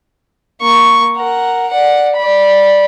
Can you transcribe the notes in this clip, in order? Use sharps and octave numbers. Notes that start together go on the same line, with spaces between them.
A#3 C#6
A#4 F#5
D5 F#5
D5 B5